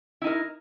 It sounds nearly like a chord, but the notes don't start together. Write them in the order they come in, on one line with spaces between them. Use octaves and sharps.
E4 D#4 A#4